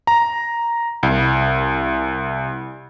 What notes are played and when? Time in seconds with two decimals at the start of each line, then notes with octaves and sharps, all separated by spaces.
0.07 A#5
1.03 C2